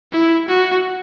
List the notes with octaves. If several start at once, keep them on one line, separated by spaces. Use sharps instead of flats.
E4
F#4